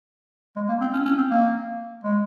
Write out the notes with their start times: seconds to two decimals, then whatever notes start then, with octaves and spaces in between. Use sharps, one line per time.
0.56 G#3
0.69 A#3
0.81 C4
0.93 C#4
1.05 C#4
1.18 C4
1.30 A#3
2.04 G#3